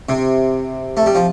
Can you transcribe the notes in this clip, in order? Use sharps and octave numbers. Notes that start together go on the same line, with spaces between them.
C3
A3
G3
F3